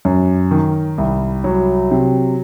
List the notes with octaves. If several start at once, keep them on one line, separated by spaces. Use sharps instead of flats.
F#2
D#3
C2
F#3
C3